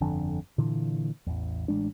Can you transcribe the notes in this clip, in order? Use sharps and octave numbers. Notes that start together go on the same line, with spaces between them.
G1 F2 D3
A#2 D3 E3
A1 E2
A1 G#3 D4